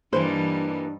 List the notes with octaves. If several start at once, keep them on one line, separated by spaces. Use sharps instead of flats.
G2 E3 G3 A#3 D4 D#4 B4 C5